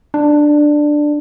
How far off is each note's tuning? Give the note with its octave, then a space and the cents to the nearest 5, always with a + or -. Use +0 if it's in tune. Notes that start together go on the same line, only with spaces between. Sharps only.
D4 +10